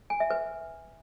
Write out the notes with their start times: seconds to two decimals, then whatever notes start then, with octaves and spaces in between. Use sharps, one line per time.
0.10 G#5
0.20 E5
0.30 B4